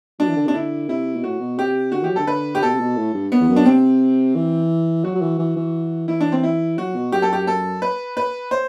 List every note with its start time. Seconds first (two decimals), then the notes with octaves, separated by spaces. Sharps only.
0.20 F#3 D4
0.28 E3
0.36 D3
0.46 C3 D4
0.54 D3 E4
0.88 C3 E4
1.16 B2
1.23 A2 F#4
1.40 B2
1.58 C3 G4
1.92 D3 F#4
2.02 E3 G4
2.10 F#3
2.16 D3 A4
2.27 D3 B4
2.55 G4
2.62 B2 A4
2.73 C3
2.80 B2
2.97 A2
3.14 G2
3.32 B3
3.41 E2
3.49 F#2
3.56 D4
3.66 C3 C4
4.35 E3
5.04 F#3 F#4
5.15 F#3
5.21 E3
5.39 E3
5.56 E3
6.08 E3 E4
6.21 D4
6.32 C4
6.43 E4
6.78 F#3 F#4
6.95 B2
7.12 F#2 G4
7.22 A4
7.33 G4
7.47 A4
7.82 B4
8.17 B4
8.51 C5